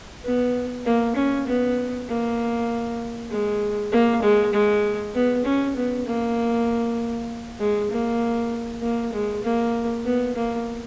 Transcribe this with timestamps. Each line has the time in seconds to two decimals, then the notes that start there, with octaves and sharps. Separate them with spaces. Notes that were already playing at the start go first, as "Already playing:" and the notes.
0.25 B3
0.86 A#3
1.16 C#4
1.47 B3
2.08 A#3
3.31 G#3
3.92 A#3
4.23 G#3
4.53 G#3
5.15 B3
5.45 C#4
5.77 B3
6.06 A#3
7.60 G#3
7.91 A#3
8.82 A#3
9.13 G#3
9.43 A#3
10.05 B3
10.36 A#3